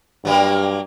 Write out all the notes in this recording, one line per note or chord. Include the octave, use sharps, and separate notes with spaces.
G2 F#3 G3 A#3